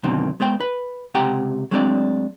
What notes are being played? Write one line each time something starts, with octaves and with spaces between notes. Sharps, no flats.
F#2 B2 D3 D#3 C4
G#3 B3 C5 G5
B4
C#2 C3 G4 F#5 G5 A#5
F#3 G#3 A3 C4 D4 D5